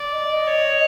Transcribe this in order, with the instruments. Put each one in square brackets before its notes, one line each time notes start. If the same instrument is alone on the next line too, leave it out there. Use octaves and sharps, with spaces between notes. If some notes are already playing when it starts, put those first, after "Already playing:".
Already playing: [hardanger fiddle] D5
[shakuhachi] D#5
D#5
[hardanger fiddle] C#5